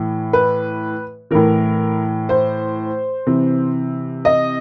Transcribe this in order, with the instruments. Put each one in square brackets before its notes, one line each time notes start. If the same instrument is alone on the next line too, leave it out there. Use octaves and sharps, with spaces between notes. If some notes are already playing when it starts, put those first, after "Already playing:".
Already playing: [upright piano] A2 E3
B4
A2 E3 A#4
C5
C3 E3
D#5